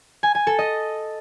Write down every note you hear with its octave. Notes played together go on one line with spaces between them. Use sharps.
G#5
G#5
A4
D#5